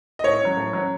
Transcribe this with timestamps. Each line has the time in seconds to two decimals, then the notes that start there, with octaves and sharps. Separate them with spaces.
0.19 D#5
0.24 A2 C#5
0.41 F#3 C#4
0.57 A2
0.73 F#3 C#4